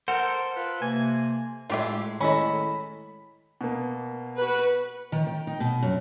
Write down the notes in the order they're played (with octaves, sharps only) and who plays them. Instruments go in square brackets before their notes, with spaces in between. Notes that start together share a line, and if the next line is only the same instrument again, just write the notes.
[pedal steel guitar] A4 C5 [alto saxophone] A#4 [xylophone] F#5
[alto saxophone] F4 [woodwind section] B4
[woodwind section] C3 A#3 [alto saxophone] G#5
[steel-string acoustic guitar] A2 G#3 [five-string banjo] F4 G4 E5
[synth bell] D#3 E4 A4 [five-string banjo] C#4 D#5 [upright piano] B5
[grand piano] B2 A#3
[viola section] F#4 B4
[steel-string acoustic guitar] D#3
G5
D#4
B2
F#2